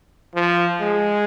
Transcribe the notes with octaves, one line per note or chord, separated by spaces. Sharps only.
F3
G#3